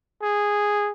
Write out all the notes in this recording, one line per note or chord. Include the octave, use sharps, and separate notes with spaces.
G#4